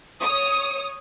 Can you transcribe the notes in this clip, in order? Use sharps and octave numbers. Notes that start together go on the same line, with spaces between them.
C#5 D#6